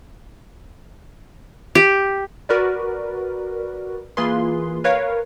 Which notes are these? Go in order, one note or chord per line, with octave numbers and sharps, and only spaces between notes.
G4
F#4 A#4 B4 D5
E3 A#3 F4 G#4 B4 C6
A#4 B4 C#5 F5